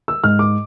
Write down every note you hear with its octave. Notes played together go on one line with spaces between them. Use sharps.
E6
G#2 F6
D6